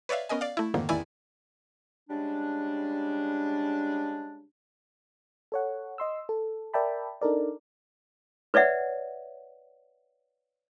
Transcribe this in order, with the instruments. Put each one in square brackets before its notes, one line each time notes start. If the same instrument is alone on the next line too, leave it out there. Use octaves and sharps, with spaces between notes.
[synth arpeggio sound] B4 C#5 D5 E5 F5
B3 C#4 A#4 D#5 G#5
D5 F5
A3 E4
F2 G#2 D3 D#3 A#3
A1 E2 D#3 E4 D5 G#5
[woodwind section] C#3 G3 G#3 D4
[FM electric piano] A4 C#5 F#5
D#5 C6 E6
A4
A#4 D5 E5 G5 A5 B5
D4 D#4 A4 A#4 D5
[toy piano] B4 C#5 D5 E5 F#5